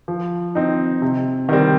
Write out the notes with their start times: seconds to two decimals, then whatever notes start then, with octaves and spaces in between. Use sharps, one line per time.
0.08 F3
0.55 C4 D#4
1.02 C3
1.49 D#3 G3 C4